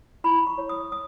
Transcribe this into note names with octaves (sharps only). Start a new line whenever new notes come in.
E4 B5
C#6
C#5
D#6
D#6